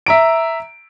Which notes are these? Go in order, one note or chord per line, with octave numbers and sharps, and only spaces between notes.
E5 A#5 D7